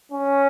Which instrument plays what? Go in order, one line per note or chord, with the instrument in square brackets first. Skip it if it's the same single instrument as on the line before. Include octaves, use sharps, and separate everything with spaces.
[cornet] C#4